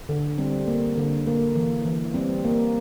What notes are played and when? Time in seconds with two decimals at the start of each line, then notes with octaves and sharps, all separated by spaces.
0.09 D3
0.38 G3 C4
0.67 A#3
0.97 D3
1.27 A#3
1.55 E3
1.85 E3
2.14 G3 C4
2.44 A#3